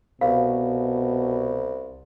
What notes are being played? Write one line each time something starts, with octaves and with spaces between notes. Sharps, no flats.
C2 B2 F5